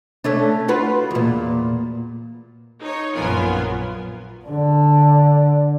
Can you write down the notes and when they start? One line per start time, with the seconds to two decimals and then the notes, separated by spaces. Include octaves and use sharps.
0.24 A3 C#4 D4
0.68 F4 F#4 B4
1.11 E2 A#2
2.81 D#4 C#5
3.15 A#1 F#2 B3 F4 A#4 G#5
4.46 D3 D4